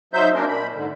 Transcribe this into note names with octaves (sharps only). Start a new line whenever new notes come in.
F#3 D#4 C5 E5 G6
A#3 C#4 D4 A#4
A#2 B5
G#2 D3